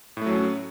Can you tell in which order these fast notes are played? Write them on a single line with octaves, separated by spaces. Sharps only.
A2 A3 F#3 C#4